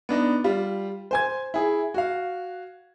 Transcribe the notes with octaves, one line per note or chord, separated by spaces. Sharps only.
B3 D4 D#4
G3 F4
C5 G#5 G#6
E4 G#4
F#4 F5